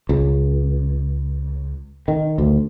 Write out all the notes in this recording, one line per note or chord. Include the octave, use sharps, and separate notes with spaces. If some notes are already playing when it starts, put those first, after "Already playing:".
C#2
D#3
D2